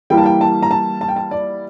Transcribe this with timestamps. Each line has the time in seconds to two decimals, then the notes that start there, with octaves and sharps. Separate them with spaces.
0.10 E3 G3 A#3 E4 G5
0.18 A5
0.26 G5
0.41 A5
0.63 A#5
0.71 A5
1.01 A5
1.08 G5
1.16 A5
1.31 D5